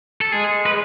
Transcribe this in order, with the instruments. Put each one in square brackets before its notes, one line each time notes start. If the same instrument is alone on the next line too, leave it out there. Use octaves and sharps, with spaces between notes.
[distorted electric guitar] A4
[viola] G#3 [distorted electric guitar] G#4
[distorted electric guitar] B4